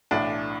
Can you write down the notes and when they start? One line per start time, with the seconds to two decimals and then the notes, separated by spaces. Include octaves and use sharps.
0.11 B1 A2 E3 D4